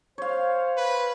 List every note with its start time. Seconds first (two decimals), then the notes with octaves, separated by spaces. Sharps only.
0.18 C5 C#5 F5
0.77 B4